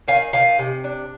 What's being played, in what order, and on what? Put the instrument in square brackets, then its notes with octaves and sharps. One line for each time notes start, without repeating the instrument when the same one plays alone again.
[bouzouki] D#3 F5 G#5
D#3 F5 G#5
C3
D4